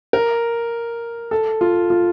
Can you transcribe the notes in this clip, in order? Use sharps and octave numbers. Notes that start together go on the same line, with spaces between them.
A#4
A4
F4
F4